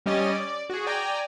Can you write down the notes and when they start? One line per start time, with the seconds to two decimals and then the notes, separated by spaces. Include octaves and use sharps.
0.06 G3 C#4 G4 D#5 G#5 A6
0.33 D5
0.70 F#4 G#4
0.87 D5 G5 G#5 A#5